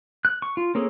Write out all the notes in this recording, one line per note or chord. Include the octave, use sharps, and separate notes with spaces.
F#6
C#6
F4
A#3 C4 C#4 G#4 A4